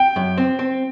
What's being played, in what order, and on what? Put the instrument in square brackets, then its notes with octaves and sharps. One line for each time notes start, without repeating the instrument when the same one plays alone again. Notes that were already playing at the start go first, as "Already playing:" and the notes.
Already playing: [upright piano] G5
[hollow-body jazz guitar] F#2
C4
C4